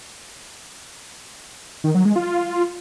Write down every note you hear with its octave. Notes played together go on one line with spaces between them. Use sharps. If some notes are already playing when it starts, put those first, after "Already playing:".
D#3
F#3
G#3
F4